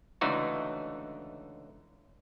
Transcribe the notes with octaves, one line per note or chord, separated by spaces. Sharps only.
C#2 D3 E3 A3 D#4 F#4